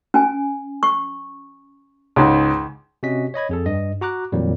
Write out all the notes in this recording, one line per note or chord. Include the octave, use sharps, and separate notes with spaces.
C#4 G#5
C#6
C#2 G#2
C3 C#4 F#4 D#5 B6
C#5 D#5 B5 G#6
F2 G#4 A4
G2 D#5
F#4 A#5 D6 F#6
F2 A#2 D#3 F#3 G3